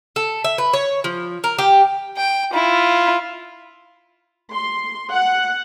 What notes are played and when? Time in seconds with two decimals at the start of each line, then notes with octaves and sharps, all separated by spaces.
0.16 A4
0.44 E5
0.58 B4
0.73 C#5
1.04 F3
1.44 A#4
1.58 G4
2.17 G5
2.53 E4 F4
4.52 C6
5.13 F#5